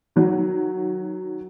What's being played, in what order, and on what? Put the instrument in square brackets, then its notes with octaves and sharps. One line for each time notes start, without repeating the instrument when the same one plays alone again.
[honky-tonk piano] D#3 F#3